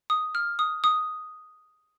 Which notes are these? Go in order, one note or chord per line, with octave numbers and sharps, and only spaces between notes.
D#6
F6
D#6
D#6